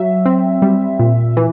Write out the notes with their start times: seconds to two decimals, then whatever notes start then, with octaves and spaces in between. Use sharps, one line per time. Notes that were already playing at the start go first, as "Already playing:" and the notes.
Already playing: F#3 E5
0.26 C4
0.62 G3
0.99 A#2
1.37 E3